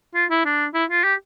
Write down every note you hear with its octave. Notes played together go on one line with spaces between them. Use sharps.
F4
E4
D4
E4
F4
G4